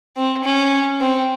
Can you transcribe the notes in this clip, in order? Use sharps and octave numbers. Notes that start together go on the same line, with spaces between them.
C4
C#4
C4